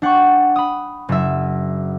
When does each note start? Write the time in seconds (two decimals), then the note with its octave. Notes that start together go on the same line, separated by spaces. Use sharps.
0.02 D4 F#5 G5 C#6
0.56 B5 D#6
1.09 F#1 E5